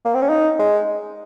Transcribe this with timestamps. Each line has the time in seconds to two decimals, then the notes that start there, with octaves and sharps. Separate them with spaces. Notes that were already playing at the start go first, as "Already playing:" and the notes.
0.05 A#3
0.14 C4
0.22 C#4
0.29 D#4
0.59 G#3